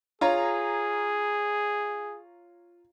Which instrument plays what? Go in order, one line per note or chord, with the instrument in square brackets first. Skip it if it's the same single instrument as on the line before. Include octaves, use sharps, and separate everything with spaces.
[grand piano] F4 C#5 A#5 [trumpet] G#4